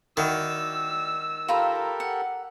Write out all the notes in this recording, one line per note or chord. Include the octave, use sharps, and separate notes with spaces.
D#3 E4 F#4 D5 E6
F4 G4 A4 A#4 A#5 B5
F#5